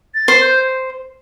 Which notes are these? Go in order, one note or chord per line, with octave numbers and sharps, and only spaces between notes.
A6
C5
G6